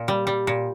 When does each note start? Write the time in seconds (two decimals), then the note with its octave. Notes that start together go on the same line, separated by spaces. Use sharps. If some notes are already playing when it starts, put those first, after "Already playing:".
Already playing: A#2
0.08 G3
0.27 G3
0.47 A#2